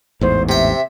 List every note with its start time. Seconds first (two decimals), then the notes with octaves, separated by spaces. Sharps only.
0.21 A1 E2 G#2 C5
0.49 C3 E5 G5